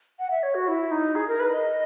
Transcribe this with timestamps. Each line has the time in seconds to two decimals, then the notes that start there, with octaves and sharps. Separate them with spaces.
0.19 F#5
0.31 E5
0.43 C#5
0.55 F#4
0.68 E4
0.91 D#4
1.15 G#4
1.28 A#4
1.40 B4
1.52 D#5